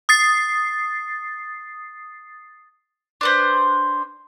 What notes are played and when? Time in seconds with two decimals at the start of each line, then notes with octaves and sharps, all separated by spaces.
0.09 D#6 A6 C7
3.21 D4 B4 C5